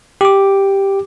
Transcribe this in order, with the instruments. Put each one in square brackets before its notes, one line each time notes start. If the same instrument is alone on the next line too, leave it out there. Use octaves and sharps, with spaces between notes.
[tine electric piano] G4 D6